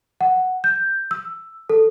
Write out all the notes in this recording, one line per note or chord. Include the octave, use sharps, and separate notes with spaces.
F#5
G6
E6
A4